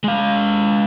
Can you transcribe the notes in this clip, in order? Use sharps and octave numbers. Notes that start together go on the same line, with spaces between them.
G#3 F5